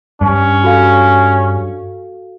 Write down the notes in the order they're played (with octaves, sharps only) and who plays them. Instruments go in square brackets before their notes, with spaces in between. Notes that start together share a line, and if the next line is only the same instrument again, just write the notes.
[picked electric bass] G2 [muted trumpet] C#4
[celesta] F#4 A4 F5